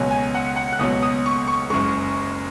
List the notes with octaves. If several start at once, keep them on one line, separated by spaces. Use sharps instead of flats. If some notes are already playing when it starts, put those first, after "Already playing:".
Already playing: C#2 B2 F#3 G#5
G#5
F#5
F#5
F#6
C#2 B2 F#3 D#6
D#6
C#6
C#6
F#1 F#2 C#3 G#3 C#6